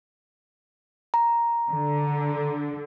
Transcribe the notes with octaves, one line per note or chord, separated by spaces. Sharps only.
A#5
D3